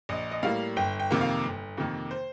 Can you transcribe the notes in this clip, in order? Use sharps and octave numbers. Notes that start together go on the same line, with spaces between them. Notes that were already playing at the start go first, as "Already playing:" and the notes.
A#1 D#5
D#5
A2 G3 A#3 F5
G1 G5
G5
F2 C3 D#3 A#3
F5
G1
F2 C3 D#3 A#3
C5